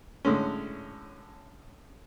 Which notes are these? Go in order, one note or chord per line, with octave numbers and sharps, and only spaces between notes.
A2 D3 G#3 C#4